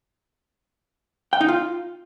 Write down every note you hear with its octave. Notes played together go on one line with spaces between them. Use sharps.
G5
D#4
F4